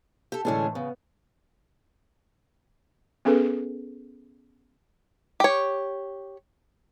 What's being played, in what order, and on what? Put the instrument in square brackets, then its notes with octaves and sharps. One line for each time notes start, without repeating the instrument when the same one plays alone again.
[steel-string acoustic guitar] G4 A4
[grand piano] A2 E3 G#3 [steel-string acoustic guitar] D3 C#4 D4
[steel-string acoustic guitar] C#3 [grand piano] B3
[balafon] B3 C#4 G#4 A4 B4
[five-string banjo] G4 C#5